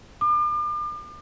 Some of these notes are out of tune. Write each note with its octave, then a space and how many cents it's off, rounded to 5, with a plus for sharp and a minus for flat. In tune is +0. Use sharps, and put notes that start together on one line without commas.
D6 +40